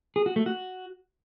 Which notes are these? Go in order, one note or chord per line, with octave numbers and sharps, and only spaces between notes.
G#4
F#4
A3
F#4